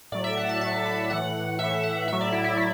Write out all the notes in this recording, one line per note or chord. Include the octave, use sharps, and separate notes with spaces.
A2 F#3 D5
E5
F#5
A5
A2 F#3 A5
B5
A2 E3 F#5
A2 E3 E5
F#5
A2 F#3 E5
D5
E4
E4
F#3 E4